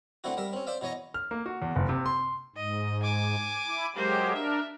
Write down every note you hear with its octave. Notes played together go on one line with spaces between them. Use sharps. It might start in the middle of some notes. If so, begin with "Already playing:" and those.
D3 A3 C4 E4 F#4
G3 A#4 E5
C4 C#4
C5 D5 E5 F5
B2 E3 C#5 D#5 A#5
F6
A#3
F#4
E2
F#1
C3
C6
G#2 D#5
G#5 D6
E4
F#3 G#3 A#3 G4 C5
D4 A#4 E5